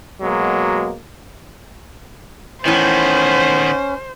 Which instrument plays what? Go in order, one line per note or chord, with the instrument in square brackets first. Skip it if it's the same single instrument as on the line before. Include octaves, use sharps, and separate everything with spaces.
[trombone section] B2 F#3 G#3 A#3
[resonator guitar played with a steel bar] A2 E3 [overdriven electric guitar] D#3 B3 [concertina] C#4 [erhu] C5